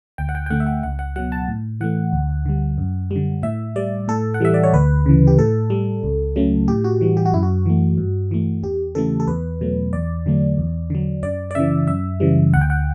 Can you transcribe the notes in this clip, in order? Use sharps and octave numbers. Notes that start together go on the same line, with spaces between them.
D2 G5
F#5
G5
G5
D3 A3 F#5
E5
F#5
C#2 F#5
F#5
B2 F#3 F#5
A5
A2
E3 A3 F#5
D2
D3 G3
F#2
D3 G3
A2 E5
G3 D5
A2 A4
F#5
E3 G3 E5
D5
C#5
D2 B4
C#3 E3
G4
A2 A4
G3
C#2
C#3 F#3 A3
A2 G4
F#4
E3 G3
G4
F#4
F#2 E4
F#4
E3 A3
G2
E3 A3
E2 G4
C#3 E3 A3 A4
A4
E2 B4
B2 F#3 A3
E2 D5
D3 F#3 A3
E2
D3 F#3
F#2 D5
D5
C#3 E3 E5
F#2 E5
C#3 E3 G3
D2 F#5
G5
F#5